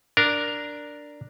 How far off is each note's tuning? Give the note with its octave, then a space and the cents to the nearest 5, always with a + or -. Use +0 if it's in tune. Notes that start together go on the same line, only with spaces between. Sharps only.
D4 +0 A#4 +0